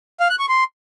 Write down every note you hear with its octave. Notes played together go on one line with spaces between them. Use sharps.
F5
F#6
C#6
C6